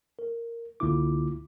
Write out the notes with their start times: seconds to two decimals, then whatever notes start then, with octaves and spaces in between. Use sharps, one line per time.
0.19 A#4
0.80 C#2 D3 A#3 E4 F4 D6